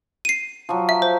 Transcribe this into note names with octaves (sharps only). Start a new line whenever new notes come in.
C7 D#7
F3 F#3
E5
C5